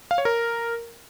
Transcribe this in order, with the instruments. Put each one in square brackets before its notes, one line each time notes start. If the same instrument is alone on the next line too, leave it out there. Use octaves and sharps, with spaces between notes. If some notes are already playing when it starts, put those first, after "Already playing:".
[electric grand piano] F5
C#5
A#4